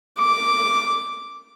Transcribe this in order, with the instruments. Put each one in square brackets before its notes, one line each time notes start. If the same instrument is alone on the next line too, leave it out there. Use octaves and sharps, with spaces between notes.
[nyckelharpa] D6